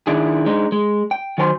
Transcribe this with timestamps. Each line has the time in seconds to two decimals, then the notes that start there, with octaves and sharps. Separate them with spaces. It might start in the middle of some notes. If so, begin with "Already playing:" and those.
0.07 D#3 D4 E4 G#4
0.46 G#3 D4 D#4
0.72 G#3
1.11 G5
1.38 D#3 F#3 C5 G#5 A#5 C6